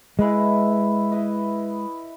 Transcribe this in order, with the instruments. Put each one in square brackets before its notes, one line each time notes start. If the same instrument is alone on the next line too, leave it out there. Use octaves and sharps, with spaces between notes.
[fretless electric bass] G#3 [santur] E4 B4 D#5
[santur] E4 B4 D#5